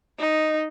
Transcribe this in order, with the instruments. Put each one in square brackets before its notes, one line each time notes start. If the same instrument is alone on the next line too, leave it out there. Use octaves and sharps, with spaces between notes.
[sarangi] D#4